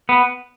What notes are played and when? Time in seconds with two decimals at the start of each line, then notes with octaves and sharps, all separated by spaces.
0.09 B3